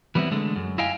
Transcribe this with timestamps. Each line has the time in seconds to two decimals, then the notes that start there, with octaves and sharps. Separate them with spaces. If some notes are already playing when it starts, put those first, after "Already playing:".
0.15 E3 G3 B3 C4 E4
0.32 D3 G#3 A3
0.56 F#2
0.78 E4 D#5 F5 G5 G#5